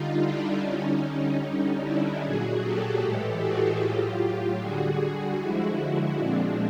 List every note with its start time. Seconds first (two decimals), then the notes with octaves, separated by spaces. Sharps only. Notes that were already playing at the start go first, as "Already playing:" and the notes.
Already playing: D3 G3 D#4 F4
0.21 D4 E4
0.60 D3 G3 C#4 D#4
1.40 D3 G3 C#4 D#4
1.80 D4 E4
2.20 A#2 F#3 F#4 G#4
2.60 G4 A4
2.99 A2 E3 G#3 G4 A4
3.39 F#4 G#4
3.79 A2 F#3 F4 G4
4.19 F4 G4
4.59 D3 G3 F#4 G#4
4.98 F#4 G#4
5.38 D3 F3 G#3 E4 F#4
6.18 A#2 F3 G#3 C4 D4